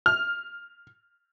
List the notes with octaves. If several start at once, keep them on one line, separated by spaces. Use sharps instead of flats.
F6